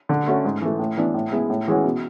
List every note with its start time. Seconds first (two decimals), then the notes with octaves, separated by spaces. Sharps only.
0.09 D3
0.28 A3 C#4 F#4
0.45 G#2
0.61 E3 A3
0.79 A2
0.97 E3 B3 D4
1.14 A2
1.32 G#3 B3 E4
1.50 A2
1.67 E3 G#3 C#4 F#4
1.84 B2